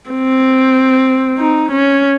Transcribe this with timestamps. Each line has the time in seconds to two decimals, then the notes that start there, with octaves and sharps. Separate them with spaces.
0.10 C4
1.38 D#4
1.72 C#4